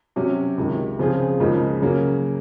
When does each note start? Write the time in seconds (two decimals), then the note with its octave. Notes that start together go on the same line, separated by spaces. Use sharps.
0.16 C3 F#3 C#4
0.58 C#2 C3 D#3
0.99 C#3 F3 C4 F4 G#4
1.40 C#2 C#3 F3 A#3 D#4
1.82 C#3 F#3 A#3 C#4